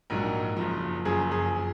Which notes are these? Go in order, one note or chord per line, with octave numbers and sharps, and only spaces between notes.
A#1 G#2 F#3 A#4
F#1 F#2 F3
F#1 F#2 F3 G#4
G#4
F3